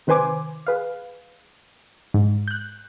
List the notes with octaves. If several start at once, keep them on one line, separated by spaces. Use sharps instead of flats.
C3 D#3 B4 C5 G#5 D6
G#4 B4 F5
G#2
F#6 G6